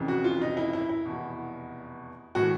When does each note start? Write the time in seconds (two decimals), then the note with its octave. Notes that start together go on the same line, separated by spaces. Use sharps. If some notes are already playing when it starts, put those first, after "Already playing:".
Already playing: F1 F2 C#3 E3
0.08 F#4
0.24 F4
0.42 D#4
0.57 E4
0.73 E4
0.89 E4
1.05 F1 E2 B2
2.35 A2 E3 F#4